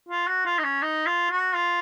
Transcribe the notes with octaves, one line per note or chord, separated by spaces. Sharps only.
F4
F#4
F4
D#4
C#4
D#4
F4
F#4
F4